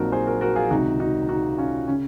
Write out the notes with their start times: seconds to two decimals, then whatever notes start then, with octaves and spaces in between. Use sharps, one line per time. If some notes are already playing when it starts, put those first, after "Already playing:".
Already playing: A#1 A#2 F#3 A#3 C4 D#4 F#4 A#4
0.12 G#4 C5
0.27 F#4 A#4
0.41 F#4 A#4
0.56 F4 G#4
0.70 C#2 C3 D#3 D#4 F#4
1.00 D#4 F#4
1.29 D#4 F#4
1.58 C#4 F4
1.87 C#3 C#4